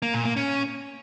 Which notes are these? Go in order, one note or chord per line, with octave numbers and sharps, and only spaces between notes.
A#3
A#2
A#3
C#4